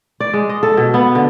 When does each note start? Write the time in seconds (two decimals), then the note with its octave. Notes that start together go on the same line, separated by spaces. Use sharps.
0.20 D5
0.34 G#3
0.49 D#5
0.63 A4
0.77 B2
0.94 B3
1.15 D3